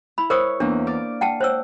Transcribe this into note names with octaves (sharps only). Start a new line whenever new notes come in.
E4 B5
A#4 C5 C#5 D#6
E2 A#3 D4
D5 F6
F#5 G5 A5
C5 C#5 E6